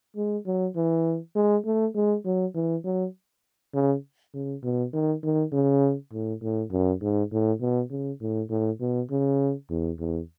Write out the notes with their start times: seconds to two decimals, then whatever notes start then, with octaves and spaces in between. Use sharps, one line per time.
0.16 G#3
0.46 F#3
0.76 E3
1.36 G#3
1.65 A3
1.95 G#3
2.25 F#3
2.55 E3
2.85 F#3
3.74 C#3
4.34 C#3
4.63 B2
4.93 D#3
5.23 D#3
5.52 C#3
6.13 A2
6.42 A2
6.71 F#2
7.02 G#2
7.32 A2
7.61 B2
7.90 C#3
8.21 A2
8.50 A2
8.80 B2
9.10 C#3
9.70 E2
9.99 E2